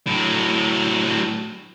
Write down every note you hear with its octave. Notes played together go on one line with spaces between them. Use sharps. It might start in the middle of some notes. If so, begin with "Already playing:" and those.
A2 F#3